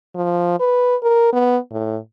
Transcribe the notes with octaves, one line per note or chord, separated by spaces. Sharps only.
F3
B4
A#4
B3
A2